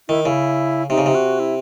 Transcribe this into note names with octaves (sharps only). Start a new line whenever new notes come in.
D#3 E4
C#3 E4
C3 D#4
C#3
C3
F#4
E4